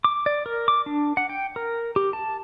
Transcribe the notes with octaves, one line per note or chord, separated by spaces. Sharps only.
D6
D5
A#4
D6
D4
F#5
G5
A#4
G4
A5